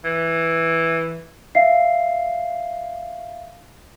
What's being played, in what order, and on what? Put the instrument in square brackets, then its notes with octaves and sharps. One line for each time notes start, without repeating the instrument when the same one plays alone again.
[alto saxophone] E3
[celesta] E5 F5 C7